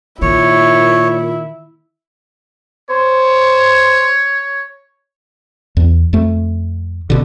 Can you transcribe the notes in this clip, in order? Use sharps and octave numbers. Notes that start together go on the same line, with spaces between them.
A#2 D#3 E4 C#5
C5 C#5
E2
F2 A3
A1 B2 D3